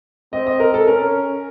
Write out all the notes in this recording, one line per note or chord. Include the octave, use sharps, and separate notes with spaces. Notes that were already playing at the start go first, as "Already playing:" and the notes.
C4 D#5
D#5
A#4
A4
C#4 A#4